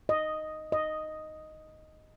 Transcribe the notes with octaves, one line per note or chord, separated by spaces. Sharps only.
D#5
D#5